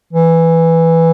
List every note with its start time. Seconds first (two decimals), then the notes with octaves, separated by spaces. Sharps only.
0.13 E3